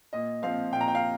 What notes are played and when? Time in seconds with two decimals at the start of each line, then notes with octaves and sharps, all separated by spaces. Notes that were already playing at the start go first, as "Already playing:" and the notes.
0.13 A#2 D#5
0.42 F3 C4 F5
0.72 A#2 G5
0.81 A#5
0.88 G5
0.95 F5